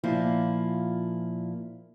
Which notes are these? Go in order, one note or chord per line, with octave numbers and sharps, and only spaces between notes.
A#2 F3 A#3 E4